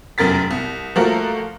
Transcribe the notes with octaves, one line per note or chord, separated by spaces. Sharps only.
F1 F#2 A#4 A6 B6
C2
F3 A3 A#3 F#4 A4 A#4